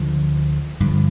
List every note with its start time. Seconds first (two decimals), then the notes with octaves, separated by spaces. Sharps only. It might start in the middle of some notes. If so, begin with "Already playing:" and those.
Already playing: D2 D3 F3
0.80 G2 D3 F3